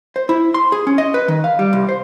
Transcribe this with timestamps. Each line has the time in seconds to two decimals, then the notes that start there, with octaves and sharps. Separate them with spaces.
0.16 C5
0.29 E4
0.54 C6
0.72 G#4
0.87 C#4
0.98 D#5
1.14 B4
1.28 D#3
1.44 F5
1.59 G3
1.73 C2
1.89 C5